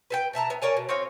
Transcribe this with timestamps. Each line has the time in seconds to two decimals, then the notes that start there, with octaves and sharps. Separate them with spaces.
0.10 B4 C5 G5
0.33 B2 E5 A5 A#5
0.50 B3
0.62 A#4 C#5 D5 G#5
0.77 B2
0.89 C4 C#5 D#5 F5